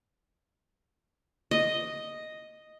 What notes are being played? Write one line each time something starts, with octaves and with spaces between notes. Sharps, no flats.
D#5